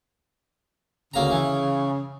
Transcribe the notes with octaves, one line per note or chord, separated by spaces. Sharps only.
D2 C#3 A#3 A#5
E3